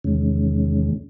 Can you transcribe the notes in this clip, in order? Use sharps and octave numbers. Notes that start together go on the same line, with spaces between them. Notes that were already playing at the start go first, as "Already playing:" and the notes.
E2 C3 D#3 G#3 C#4